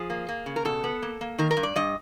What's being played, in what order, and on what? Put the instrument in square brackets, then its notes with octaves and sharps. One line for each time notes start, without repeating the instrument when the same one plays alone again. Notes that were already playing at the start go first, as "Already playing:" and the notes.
Already playing: [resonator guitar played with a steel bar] F3 G#4
A#3
A#3
C#3
A#4
B2 A4
B3
A#3
A#3
D#3 A#4
A#4
G2
D5
G2 D#5